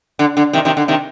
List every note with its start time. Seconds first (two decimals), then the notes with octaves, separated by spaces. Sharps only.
0.19 D3
0.37 D3
0.53 C3 D#3
0.65 C3 D#3
0.77 D3
0.88 C3 D#3